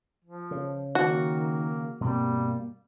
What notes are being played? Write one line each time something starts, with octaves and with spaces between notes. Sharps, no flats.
F3
C#3
D#3 A#3 F#4
G2 B2 G3 A#3 C4